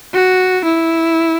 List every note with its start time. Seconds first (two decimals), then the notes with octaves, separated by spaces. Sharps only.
0.14 F#4
0.65 E4